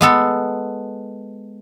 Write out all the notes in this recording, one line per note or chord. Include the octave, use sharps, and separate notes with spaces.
G#3 B3 A4